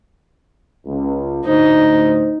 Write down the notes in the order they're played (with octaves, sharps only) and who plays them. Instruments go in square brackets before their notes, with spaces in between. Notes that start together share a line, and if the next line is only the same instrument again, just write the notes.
[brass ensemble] C#2
[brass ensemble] D2 A2 C5 [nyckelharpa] D#4